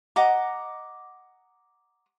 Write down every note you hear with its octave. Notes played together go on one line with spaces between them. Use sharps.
D#5 F#5 A#5 D6